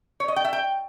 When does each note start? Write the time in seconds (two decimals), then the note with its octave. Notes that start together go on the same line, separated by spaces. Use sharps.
0.20 C#5
0.28 D#5
0.36 G5
0.45 E5
0.53 G5